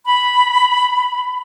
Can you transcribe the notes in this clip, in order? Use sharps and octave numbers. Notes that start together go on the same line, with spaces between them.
B5